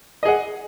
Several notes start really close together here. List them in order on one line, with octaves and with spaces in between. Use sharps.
D#5 G#4 F#5